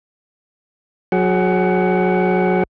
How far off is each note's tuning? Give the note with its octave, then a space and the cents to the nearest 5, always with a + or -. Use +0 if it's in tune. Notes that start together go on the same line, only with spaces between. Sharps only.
F#3 -20 G#4 +15 F#5 +20